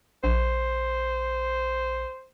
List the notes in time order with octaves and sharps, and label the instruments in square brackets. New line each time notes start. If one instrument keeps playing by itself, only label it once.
[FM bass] A#1 [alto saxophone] C5